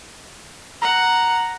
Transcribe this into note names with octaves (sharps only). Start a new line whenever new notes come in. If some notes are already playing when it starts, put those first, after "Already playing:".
F#5 A#5